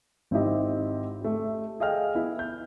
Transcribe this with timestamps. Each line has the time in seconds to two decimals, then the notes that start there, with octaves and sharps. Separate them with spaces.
0.31 G#1 C4 D#4 E4 G4 D#5
1.21 A3 G4
1.80 G#4 A4 D#5 F5 G5 F6
2.15 B3 E4
2.39 G6